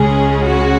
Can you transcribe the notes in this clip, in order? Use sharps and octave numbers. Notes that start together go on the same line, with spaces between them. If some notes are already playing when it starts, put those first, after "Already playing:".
Already playing: C#2 C#3 G#3 C#4 G#4
F#4